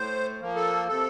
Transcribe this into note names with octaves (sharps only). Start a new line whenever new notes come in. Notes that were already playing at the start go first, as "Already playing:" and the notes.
Already playing: A2 C5
F3 A#3
A4
C3 A4